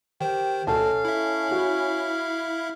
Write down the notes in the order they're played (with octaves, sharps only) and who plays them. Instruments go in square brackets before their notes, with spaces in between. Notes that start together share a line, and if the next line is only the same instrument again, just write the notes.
[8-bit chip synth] D#3 C5 [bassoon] G4
[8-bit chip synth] D2 B2 [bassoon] C#4 [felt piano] A4 A5 [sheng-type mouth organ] F5
[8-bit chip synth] E4 E5
[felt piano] F#4